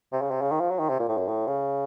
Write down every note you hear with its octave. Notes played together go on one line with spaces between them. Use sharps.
C3
C#3
C3
C#3
D#3
F3
F#3
D#3
C3
A#2
A2
F#2
A2
C#3